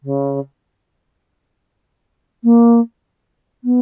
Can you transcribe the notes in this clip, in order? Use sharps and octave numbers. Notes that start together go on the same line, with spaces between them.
C#3
A#3
B3